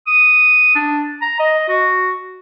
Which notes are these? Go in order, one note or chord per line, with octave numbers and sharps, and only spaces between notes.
D#6
D4
A#5
D#5
F#4